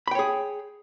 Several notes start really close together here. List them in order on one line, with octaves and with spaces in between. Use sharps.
B5 G5 C#5 G#4